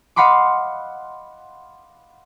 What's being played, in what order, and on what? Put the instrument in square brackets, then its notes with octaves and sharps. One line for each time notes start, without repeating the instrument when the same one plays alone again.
[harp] D#5 F5 F#5 B5 C6 D6